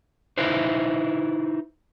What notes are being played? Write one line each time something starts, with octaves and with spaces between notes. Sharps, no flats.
D#4 E4 B4 C5